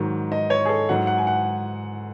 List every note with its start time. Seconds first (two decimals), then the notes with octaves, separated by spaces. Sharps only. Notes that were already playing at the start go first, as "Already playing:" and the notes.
Already playing: G#2 D#3 F#3
0.32 D#5
0.50 C#5
0.65 G#4
0.69 A4
0.89 G#2 F#3 F#5
1.07 F#5
1.18 G#5
1.27 F#5